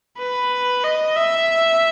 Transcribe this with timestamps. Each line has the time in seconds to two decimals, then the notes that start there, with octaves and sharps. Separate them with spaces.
0.18 B4
0.84 D#5
1.16 E5